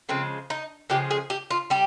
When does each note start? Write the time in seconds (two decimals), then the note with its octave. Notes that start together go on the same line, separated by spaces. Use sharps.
0.09 C#3 F3 G#3 C4
0.50 D#4
0.90 C#3 F3 G#3 G4
1.11 G#4
1.30 G4
1.51 F4
1.70 G3 G4